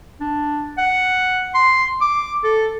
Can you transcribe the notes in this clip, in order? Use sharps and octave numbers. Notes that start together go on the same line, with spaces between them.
D4
F#5
C6
D6
A4